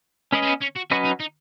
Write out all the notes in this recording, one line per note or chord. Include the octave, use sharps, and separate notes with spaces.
G#3 C#4 B4 D#5
G#3
B3
C#4
F#4
F#3 C#4 F#4 B4 D#5
D#4
D#4